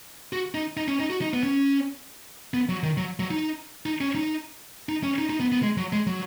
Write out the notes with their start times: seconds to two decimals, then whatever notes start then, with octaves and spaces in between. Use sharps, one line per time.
0.33 F#4
0.55 D#4
0.77 D#4
0.88 C#4
1.00 D#4
1.10 F#4
1.21 D#4
1.34 B3
1.43 C#4
2.54 B3
2.69 F#3
2.83 D#3
2.97 F#3
3.19 F#3
3.31 D#4
3.86 D#4
4.01 C#4
4.15 D#4
4.89 D#4
5.03 C#4
5.18 D#4
5.30 D#4
5.40 B3
5.52 B3
5.63 G#3
5.77 F#3
5.93 G#3
6.07 F#3